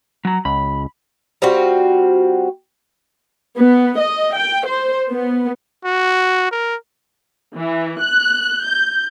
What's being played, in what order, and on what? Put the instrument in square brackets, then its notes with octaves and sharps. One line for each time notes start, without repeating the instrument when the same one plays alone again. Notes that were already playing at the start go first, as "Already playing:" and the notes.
[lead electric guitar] F#3 A#5
[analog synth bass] C#2 [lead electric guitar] B5
[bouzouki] G3 C4 F4 F#4
[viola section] B3
D#5
G5
C5
B3
[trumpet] F#4
A#4
[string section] E3
F#6
G6